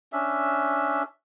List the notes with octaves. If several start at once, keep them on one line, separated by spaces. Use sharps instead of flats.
C#4 D4 E5